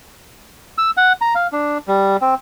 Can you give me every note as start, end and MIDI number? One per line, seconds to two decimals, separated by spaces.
0.78 0.90 88
0.97 1.13 78
1.21 1.34 82
1.35 1.47 77
1.52 1.78 62
1.88 2.17 55
2.21 2.34 60